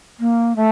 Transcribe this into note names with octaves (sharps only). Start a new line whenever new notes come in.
A#3
A3